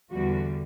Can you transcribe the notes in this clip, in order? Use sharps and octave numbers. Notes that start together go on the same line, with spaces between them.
E2 D3 G3 F#4